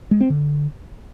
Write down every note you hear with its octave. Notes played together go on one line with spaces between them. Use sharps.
G#3
C4
D3